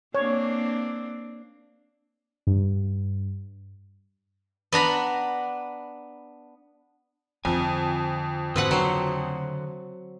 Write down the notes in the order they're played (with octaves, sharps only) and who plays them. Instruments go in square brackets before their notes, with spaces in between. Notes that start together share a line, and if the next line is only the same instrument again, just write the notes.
[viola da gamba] A#3 C4 D4 [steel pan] C#5
[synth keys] G2
[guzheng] B3 D4 A#5 B5
[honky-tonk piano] F2 [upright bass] D3 [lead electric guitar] G#5
[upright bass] G#2 B3 [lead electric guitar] D3 F#4 [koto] C4 B4 F#5
[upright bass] C#3 [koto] F#3 C5